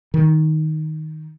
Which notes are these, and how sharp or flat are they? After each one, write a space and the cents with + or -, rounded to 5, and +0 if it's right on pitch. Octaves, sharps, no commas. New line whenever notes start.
D#3 +5